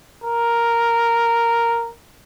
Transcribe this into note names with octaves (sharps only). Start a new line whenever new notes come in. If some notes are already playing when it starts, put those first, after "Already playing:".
A#4